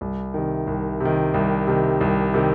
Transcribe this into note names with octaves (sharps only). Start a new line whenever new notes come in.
C2
C3 D#3
C2
C3 D#3
C2
C3 D#3
C2
C3 D#3